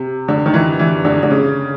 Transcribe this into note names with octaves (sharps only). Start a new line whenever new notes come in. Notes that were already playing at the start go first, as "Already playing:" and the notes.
Already playing: C3
D3
D#3
E3
E3
D3
D3
C#3